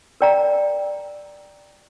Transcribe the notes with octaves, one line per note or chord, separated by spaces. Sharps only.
A#4 D5 G5 A#5